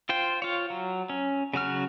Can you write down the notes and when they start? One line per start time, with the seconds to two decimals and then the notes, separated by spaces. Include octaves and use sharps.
0.09 F4 C5 G5
0.42 F4 C#5
0.70 F#3
1.10 C#4
1.53 C#3 F#3 F#4 F6